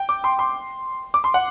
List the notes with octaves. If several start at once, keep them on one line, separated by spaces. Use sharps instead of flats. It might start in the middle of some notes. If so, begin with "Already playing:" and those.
Already playing: G5
D6
C6
C6
D6
C6
F#5